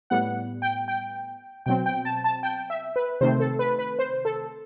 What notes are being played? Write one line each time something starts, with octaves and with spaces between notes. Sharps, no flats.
A2 G3 B3 F#5
G5
G5
B2 F#3 C4 G5
G5
A5
A5
G5
E5
B4
C3 D#3 A3 C4 C5
A4
B4
B4
C5
A4